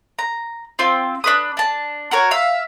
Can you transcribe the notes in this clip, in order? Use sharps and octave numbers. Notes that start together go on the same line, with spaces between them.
A#5
C4 F4
D4 B4 D#6
D4 A5
F#4 A#4 C#5
E5 F5